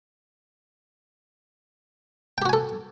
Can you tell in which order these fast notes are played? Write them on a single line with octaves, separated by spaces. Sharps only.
G5 G4 F#4 G#5 A4